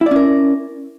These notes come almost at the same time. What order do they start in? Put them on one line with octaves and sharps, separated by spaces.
E4 D5 C#4 A#4